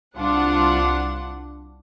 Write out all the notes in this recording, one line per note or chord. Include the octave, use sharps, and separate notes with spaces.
C2 D4 F4 F#5